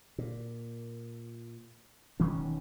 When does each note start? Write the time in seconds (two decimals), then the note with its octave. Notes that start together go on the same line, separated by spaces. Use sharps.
0.18 A#2
2.20 E1 D#3 E3 C#4